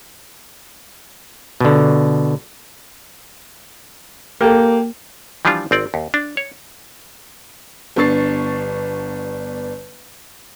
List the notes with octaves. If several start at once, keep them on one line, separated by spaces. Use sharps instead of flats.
B2 D3
A#3 G4 A4
E3 F3 G3 D4 F4
G#1 C4 D5
D#2
D4
C#5
G1 B3 D4 C#6 A6 C7